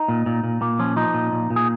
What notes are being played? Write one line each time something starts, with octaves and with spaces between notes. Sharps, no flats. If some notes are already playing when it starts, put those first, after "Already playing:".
Already playing: D#4
A#2
A#2
A#2
A#2 A#3
F3 C#4
F3 D#4
A#2
A#2
A#2
G#4